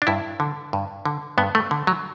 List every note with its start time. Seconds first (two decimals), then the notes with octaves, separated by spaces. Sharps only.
0.02 D4
0.07 G2 E4
0.40 D3
0.73 G2
1.05 D3
1.38 G2 B3
1.55 A3
1.71 D3
1.87 F#3